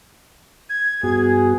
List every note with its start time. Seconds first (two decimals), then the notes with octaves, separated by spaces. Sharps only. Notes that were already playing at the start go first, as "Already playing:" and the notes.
0.70 G#6
1.03 G2 B3 F#4 G#4